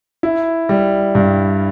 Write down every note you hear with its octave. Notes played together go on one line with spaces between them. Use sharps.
E4
G3
G2